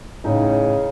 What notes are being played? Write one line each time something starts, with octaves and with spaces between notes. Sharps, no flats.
A2 C#3 D#4